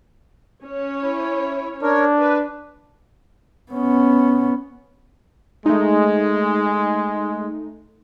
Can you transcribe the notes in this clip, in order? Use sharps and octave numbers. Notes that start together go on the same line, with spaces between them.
C#4 C#5
E4
D4 A#4 C#5
B4
B3 C#4
G#3 A3 D#4